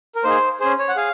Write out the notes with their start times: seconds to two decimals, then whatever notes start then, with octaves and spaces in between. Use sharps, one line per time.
0.15 A#4
0.24 A#3 D#4 G#4 C5
0.60 C#4 G#4 C5
0.79 C#5
0.89 F#5
0.96 G#4 F5